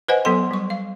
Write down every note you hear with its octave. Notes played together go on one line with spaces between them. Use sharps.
B4 C5 D#5 F#5 G#5
F#3 B3 A4 C6
G3 C#6
F5